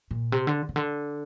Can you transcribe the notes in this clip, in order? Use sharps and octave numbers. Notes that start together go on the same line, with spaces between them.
A#2
C3
D3
C3
D3